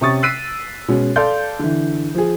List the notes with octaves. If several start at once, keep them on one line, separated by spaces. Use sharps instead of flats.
C3 C#4 C#6 D#6 A6
E6 F#6 B6 C7 D7 D#7
B2 G#3 C#4
A4 D5 F5 C6 G6
D3 E3
F3 G#4